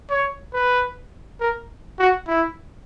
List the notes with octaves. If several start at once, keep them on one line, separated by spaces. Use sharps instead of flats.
C#5
B4
A#4
F#4
E4